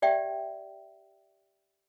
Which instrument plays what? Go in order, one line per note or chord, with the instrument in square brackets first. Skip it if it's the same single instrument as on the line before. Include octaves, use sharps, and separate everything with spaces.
[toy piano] G4 D5 E5 G5